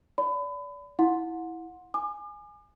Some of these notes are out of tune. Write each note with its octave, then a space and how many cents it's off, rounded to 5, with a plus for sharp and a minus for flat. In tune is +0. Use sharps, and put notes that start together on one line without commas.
D5 -35 B5 +30
E4 -5 F#5 -30 C6 +10
G#5 +0 D6 +45